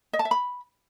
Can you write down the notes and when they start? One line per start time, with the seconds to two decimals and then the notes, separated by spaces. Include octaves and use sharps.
0.13 D#5
0.19 A5
0.25 E5
0.31 B5